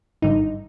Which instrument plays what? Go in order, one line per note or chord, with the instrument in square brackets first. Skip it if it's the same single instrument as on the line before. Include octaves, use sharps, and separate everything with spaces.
[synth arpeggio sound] G#1 G2 D3 D#4